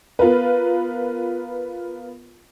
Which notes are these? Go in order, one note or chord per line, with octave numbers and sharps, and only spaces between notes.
B3 F4 A#4 B4